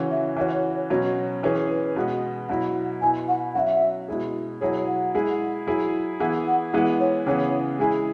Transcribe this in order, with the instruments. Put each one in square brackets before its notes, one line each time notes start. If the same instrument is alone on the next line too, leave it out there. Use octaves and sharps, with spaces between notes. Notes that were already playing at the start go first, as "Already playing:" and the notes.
Already playing: [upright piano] C#3 E3 C#4 F#4
[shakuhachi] E5
[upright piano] E3 C#4 F#4 [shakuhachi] C#5 E5
[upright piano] B2 F#3 C#4
[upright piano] E3 C#4 G#4 [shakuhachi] B4
[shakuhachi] B4
[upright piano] B2 G#3 B3
[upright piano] B2 F#3 E4 [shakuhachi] F#5
[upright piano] B2 B3 E4 [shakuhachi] G#5
[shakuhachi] F#5
[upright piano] F#3 C#4 F#4 [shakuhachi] E5 F#5
[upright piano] B2 G#3 E4 G#4
[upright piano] B2 F#3 E4 G#4 [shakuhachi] C#5
[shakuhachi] F#5
[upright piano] G#3 E4 G#4
F#3 E4 G#4
[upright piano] E3 B3 E4 G#4 [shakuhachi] F#5
[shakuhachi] F#5
[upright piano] E3 G#3 B3 E4 [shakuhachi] F#5
[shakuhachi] C#5
[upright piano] C#3 E3 B3 G#4 [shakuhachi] C#5
[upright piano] G#3 E4 G#4 [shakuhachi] G#5